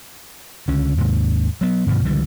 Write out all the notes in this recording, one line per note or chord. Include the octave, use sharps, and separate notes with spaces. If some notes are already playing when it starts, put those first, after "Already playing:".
C#2 D3 C#4
D#2 G#2 C3
F#3 B3
G2 B2 D#3 F3
C#2 D3 E3 G3